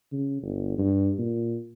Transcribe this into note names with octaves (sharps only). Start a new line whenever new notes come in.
C#3
G1
G2
A#2